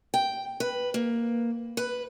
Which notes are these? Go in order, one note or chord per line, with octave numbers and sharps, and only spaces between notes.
G5
B4
A#3
B4